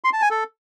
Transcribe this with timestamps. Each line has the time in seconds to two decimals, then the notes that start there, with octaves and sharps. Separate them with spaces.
0.04 C6
0.13 A5
0.22 G#5
0.31 A4